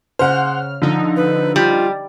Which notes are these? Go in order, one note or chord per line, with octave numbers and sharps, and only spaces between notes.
C#3 C5 F#5 F6
D3 F3 D#4
B4
G3 F4